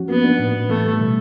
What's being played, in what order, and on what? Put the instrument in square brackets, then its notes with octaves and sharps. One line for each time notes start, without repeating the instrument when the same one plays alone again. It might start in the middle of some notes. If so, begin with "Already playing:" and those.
Already playing: [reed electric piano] F3 C#4 F#4
[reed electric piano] A#3 [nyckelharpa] B3
[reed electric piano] D4
A2
B3
[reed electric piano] E3 [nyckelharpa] A3
[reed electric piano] G3
B2